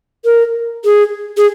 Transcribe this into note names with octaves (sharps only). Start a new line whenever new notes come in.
A#4
G#4
G#4